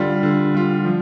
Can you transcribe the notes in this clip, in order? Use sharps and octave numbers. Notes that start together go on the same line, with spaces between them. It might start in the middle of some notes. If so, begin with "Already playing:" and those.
Already playing: D3 G3 F4
D3
G3 F4
F3